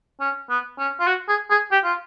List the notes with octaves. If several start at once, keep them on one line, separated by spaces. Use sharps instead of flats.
C#4
B3
C#4
F4
F#4
G#4
G#4
G4
F4